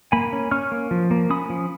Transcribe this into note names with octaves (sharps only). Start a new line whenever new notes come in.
A#3 G#5 B5
C#4
C#4 C#6 F6
A#3
F3
A#3
C#4 B5 D#6
F3